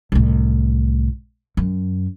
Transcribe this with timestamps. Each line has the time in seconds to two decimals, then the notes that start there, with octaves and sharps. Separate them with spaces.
0.12 C2 A2
1.57 F#2